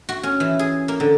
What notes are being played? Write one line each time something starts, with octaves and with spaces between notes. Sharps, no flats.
F#4
C#4
E3
G#4
A#3
D3